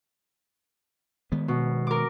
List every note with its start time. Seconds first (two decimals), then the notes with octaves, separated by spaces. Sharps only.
1.32 D#3 G#3 B3
1.48 B2
1.87 A#4 D6